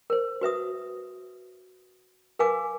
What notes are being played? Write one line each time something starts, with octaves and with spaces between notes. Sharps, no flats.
A#4 C5
F#4 B4 E5 D#6
A#4 B4 F5 G#5 D6